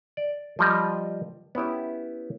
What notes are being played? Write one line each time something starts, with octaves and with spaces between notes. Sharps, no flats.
D5
F3 G3 D#5
B3 C#4 E4 G4